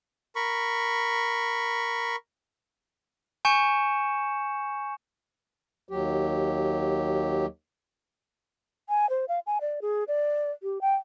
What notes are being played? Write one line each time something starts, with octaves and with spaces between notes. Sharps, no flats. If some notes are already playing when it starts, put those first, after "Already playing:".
A#4 B5 C#6
G#5 C#6 G6 C#7 E7
D#2 F#3 G4
G#5
C5
F5
G#5
D5
G#4
D5
G4
G5